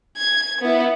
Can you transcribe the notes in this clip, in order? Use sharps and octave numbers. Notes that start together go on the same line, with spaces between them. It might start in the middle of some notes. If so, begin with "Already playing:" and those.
G#6
B3 E4